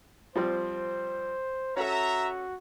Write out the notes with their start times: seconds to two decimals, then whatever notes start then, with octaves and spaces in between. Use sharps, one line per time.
0.35 F3 G3 C4 C5
1.77 C#4 F#4 A4 E5 A#5